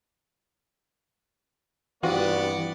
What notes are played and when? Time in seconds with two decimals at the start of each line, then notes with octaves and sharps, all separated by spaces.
2.03 G2 E3 B3 C4 F4 F#4 D5 F#5